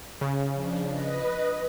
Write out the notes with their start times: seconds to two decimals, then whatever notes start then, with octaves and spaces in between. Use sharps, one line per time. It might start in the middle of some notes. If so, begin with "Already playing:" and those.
0.21 C#3
0.53 F3 D4
0.89 B4 D#5